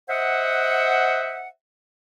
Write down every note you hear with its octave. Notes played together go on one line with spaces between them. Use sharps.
C5 D#5 E5 F#5